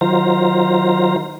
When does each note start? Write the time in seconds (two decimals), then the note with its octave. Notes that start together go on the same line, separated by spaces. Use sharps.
0.01 D#3 F#3 F4 C5 A#5